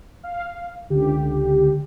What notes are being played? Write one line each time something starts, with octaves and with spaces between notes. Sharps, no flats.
F5
C#2 D3 G4